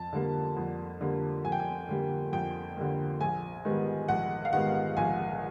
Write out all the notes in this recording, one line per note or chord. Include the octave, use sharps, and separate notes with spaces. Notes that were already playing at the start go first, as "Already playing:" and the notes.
Already playing: F2 A5
D3 G3 A#3
F2
D3 G3 A#3
F2 G#5
G5
G#5
D3 G3 A#3
F2 G5
D3 G3 A#3
A#1 G#5
G#2 D#3 G3 B3
A#1 F#5
F5
G#2 D#3 G3 B3 F#5
A#1 G#5